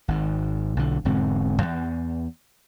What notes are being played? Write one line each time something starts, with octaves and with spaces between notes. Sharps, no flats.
G#1 G#2
B1 D3
E1 G#2 D3 C4
E2